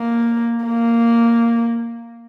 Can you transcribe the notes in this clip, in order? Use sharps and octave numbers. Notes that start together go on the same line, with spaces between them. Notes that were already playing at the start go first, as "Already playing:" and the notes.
Already playing: A#3
A#3